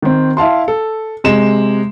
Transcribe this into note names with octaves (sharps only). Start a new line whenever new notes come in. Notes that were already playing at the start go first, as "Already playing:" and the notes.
D#3 C4
E4 F5 A5 C6
A4
C3 G#3 E7